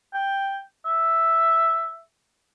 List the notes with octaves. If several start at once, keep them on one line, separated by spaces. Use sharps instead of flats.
G5
E5